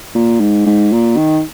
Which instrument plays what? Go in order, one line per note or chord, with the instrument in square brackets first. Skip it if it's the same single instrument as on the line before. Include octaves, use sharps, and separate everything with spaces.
[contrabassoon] A#2
G#2
G#2
A#2
D#3